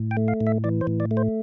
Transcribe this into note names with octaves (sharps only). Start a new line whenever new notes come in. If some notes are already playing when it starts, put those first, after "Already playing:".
Already playing: A2
G5
A3
F5
A2
E5
E3 D5
C5
A2
D5
A3
C5